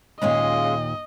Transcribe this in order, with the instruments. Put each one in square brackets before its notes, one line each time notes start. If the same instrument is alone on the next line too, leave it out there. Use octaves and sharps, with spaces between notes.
[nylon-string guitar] D#2 A#2 [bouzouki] G#3 C#4 F4 [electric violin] D#5